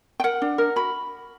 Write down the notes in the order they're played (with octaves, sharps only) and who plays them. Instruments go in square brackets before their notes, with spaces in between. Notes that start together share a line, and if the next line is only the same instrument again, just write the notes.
[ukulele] G5
A#4 F#5
D4
A#4
F#4 B5